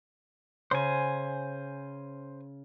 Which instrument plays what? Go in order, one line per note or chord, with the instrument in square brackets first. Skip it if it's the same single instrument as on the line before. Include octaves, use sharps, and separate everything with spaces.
[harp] C#3 [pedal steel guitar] C5 G#5